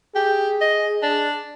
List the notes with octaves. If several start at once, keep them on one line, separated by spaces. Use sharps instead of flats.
G4 G#4
D#5
D4